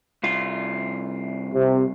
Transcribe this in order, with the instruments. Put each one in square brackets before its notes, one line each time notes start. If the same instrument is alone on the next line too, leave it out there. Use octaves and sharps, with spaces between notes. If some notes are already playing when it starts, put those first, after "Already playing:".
[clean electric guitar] C2 F4
[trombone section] C3